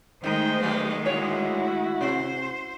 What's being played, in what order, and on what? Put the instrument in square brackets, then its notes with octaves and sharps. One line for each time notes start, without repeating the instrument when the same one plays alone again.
[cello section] D#3 G#3 A3 [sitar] D#4 [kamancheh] C5 G5
[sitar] F#3 A#3 B3
[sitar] A#2 C#5 [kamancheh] E4 F#4
[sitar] C3 [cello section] C5